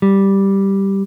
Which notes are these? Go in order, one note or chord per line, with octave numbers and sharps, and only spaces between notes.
G3